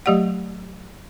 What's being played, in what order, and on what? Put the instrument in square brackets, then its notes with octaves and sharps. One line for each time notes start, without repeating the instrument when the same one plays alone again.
[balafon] F#3 A3 G4 D5 F#5